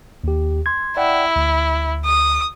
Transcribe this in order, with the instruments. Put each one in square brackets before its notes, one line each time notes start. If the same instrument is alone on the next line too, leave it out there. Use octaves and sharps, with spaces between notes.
[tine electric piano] D#2 G4
C6 G#6
[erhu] E4 [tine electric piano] D5 F#5 G5
[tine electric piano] D2
[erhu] D#6